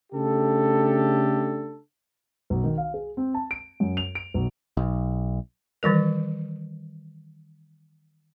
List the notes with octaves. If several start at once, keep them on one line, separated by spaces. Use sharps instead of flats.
C#3 A3 D4 G4 A4
B1
D#3
F5
G#4
C4
A5
D7
F#2
F7
D7
B1
B1
D#3 E3 G3 A#4